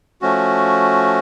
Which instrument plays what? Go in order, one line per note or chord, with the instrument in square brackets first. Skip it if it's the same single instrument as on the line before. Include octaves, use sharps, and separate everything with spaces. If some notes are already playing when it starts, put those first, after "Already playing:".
[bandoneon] F3 A3 C#4 F#4